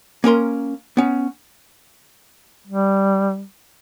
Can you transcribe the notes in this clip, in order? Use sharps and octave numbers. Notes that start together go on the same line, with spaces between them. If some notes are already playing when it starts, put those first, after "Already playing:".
A#3 C#4 A#4 C6
B3 C#4
G3